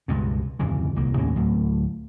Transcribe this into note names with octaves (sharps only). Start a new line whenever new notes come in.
C#2 G2 B2
D1 F2 C#3 E3
D#1 C2 A#3
D#2 A2 A#3 C#4
D2 A2 F#3 A3